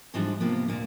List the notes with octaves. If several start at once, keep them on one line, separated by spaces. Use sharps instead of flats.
G#2 E3 F3 G3 G#3 D4
C3 F3 A#3 B3
D2 A#2 A#3